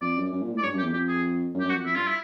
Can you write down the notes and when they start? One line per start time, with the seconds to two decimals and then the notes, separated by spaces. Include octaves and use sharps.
0.01 F2 D5
0.17 F#2
0.32 F#2
0.42 A#2
0.52 A2
0.58 D5
0.63 G2 C#5
0.73 F#2
0.78 G4
0.83 E2
0.93 F2 G4
1.08 G#4
1.55 F#2
1.60 G4
1.65 F#2
1.69 F#4
1.75 F2
1.85 F2 E4
1.95 G2 F4
2.07 E4